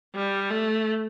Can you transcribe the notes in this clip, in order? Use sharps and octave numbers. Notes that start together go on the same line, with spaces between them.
G3
A3